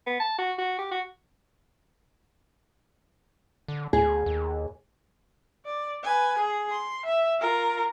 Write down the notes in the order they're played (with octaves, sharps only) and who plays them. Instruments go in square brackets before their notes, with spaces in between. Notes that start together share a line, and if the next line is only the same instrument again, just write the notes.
[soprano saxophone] B3
A5
F#4
F#4
G4
F#4
[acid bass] D3
[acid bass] D2 [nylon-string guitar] G#4
[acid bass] D#2
[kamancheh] D5
B4 G#5
G#4
C6
E5
F4 A#4